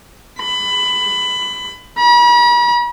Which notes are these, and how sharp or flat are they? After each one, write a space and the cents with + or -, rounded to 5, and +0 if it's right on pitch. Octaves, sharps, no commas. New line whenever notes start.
B5 +20
B5 -45